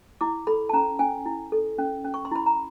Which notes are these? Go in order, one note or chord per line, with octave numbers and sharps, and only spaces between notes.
E4 D6
A4 B5
A5
C#4 A#5
C#4 G#5
E4
A4
C#4
C#4
C#6
C6
E4 B5
A#5